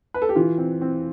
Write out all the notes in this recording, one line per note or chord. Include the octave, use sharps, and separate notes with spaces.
B4
A4
G4
E3 F4
C4
C4